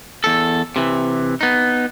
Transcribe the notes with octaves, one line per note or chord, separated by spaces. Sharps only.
E2 A4
C3 E3
B3 D#4